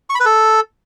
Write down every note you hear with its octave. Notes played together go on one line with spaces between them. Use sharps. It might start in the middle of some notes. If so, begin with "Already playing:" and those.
C#6
B5
B4
A4